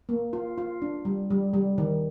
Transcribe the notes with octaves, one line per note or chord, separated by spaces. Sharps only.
A#3
F4
F4
D4
G3
G3
G3
D#3